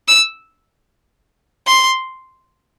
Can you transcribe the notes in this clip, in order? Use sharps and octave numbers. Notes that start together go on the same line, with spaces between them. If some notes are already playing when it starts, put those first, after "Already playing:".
E6
C6